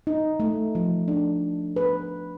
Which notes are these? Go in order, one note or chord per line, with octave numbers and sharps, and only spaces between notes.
D#4
A3
F3
D4
B4